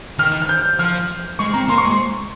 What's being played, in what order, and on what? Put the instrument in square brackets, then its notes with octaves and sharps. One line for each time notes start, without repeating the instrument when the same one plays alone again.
[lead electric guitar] D#3 [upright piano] F6
[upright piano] F6
G6
[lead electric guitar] F3 [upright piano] F6
[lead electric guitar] G#3 [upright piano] C#6
[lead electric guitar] C4 [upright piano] A#5
[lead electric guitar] A#3 [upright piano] C6
[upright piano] C#6
[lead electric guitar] G#3
[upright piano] C6